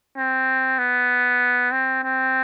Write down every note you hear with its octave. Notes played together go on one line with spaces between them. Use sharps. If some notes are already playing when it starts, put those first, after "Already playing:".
C4
B3
C4
C4